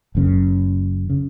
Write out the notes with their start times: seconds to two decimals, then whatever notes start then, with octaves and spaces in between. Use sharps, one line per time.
0.15 F#1 F#2 C#3
1.10 C#3